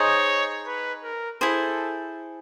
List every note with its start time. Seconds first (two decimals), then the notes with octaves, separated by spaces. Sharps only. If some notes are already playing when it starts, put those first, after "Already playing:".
Already playing: D#4 G#4 C5 C#5 D#5
0.67 B4
1.04 A#4
1.40 E4 G#4 A4 C5